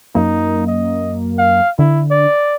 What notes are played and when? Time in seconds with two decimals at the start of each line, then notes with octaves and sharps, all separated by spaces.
0.15 F#2 A#3 D#4
0.67 D#5
1.38 F5
1.79 D3 E4
2.10 D5